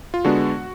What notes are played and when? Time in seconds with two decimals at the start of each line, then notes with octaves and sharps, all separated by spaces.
0.14 F4
0.25 D3 G#3 B3 D4 F#4